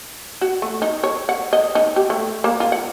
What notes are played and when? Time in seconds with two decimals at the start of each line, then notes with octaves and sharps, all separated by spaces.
0.41 F#4
0.62 A3
0.82 D#4
1.04 C#5
1.29 F#5
1.53 D#5
1.75 D#4
1.96 G4
2.10 A3
2.44 A#3
2.60 F4
2.72 F#5